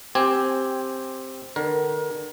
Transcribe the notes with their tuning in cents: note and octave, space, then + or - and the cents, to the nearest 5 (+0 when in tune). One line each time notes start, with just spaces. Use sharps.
C4 +5 G4 +0 G#5 +0
D3 +40 A#4 +30